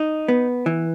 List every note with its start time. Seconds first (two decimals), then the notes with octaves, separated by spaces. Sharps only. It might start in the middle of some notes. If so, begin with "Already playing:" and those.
Already playing: D#4
0.28 B3
0.66 E3